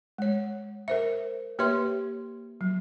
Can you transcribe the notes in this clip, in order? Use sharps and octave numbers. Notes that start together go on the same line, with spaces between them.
G#3 C#5
A#4 C5 E5
A#3 G4 B4 C#5 E5 C6
F#3